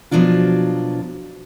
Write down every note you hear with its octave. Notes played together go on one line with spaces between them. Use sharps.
B2 F3 F#3 D4 F4